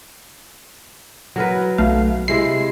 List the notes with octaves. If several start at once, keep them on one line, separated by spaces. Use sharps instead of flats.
F#3 A#4 B4
B1 A3 F5
C3 G#3 E4 C7